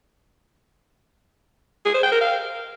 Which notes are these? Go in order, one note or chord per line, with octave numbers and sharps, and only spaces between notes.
G#4
C5
G5
A#4
F5